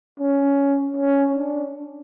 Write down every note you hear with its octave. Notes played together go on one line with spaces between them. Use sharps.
C#4
C#4
D4